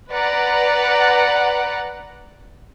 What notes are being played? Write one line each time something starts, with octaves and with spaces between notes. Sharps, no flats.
B4 D5 F#5 A#5